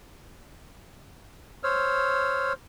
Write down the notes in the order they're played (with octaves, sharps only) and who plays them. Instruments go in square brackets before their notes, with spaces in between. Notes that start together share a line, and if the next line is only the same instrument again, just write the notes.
[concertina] C5 C#5 E6 F6